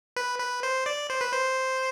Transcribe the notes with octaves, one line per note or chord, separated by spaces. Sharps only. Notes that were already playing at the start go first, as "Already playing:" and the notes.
B4
B4
C5
D5
C5
B4
C5